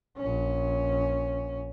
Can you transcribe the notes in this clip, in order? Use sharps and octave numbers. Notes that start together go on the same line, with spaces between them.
A#1 C#4